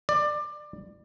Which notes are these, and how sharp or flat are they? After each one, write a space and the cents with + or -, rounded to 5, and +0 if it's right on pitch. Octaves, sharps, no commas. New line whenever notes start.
D5 +20